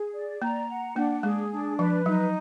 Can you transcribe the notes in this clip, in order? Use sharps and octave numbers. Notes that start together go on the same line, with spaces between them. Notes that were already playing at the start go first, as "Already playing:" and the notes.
Already playing: G#4
D5
A#3 A#5
F#5
A#3 D4
G#3 G#4
D4
F3 B4
F#3 D#4